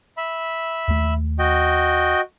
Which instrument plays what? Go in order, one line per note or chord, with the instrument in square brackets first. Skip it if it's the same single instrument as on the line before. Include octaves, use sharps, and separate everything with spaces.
[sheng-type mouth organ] E5 B5
[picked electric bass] D#2 A3
[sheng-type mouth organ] F#4 D#5 G5